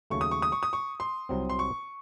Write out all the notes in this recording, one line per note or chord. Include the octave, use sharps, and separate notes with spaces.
D#2 C#3 F#3 A3 C#6
D#6
C#6
D#6
C#6
D#6
C#6
C6
C2 C3 F#3 C4
C6
C#6